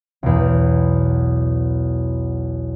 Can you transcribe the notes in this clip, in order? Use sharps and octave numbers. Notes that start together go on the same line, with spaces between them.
B1 E2